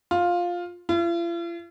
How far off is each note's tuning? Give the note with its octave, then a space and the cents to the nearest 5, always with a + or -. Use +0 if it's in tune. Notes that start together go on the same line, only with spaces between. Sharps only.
F4 +10
F4 -45